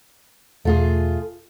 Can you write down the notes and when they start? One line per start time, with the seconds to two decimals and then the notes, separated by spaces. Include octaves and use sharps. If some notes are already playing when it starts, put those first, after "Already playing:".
0.65 E1 A3 F4 G#4